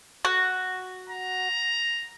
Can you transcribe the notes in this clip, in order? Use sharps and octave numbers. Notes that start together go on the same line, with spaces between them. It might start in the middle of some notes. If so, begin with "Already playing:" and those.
F#4
A#5